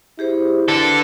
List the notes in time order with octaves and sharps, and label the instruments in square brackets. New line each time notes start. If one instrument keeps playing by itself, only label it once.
[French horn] E4 [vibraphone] G4 G#4 C5
[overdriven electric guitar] D3 [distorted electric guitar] A4 [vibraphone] B4